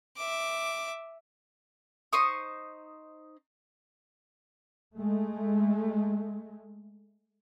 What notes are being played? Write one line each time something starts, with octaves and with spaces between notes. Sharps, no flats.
E5 D6
D#4 C5 C#6 D#6
G#3 A3